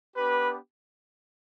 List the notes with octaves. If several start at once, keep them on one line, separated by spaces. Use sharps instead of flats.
B3 D4 G4 B4